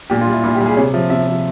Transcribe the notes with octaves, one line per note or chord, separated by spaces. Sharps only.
A#2 G4
F4
G3
E4
A#2 E4
G4
G3
G#4
C3 C#5
F3 E5
C3 E5
F3